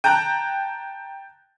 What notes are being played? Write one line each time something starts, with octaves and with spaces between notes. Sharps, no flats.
G5 A5 A#5 F#6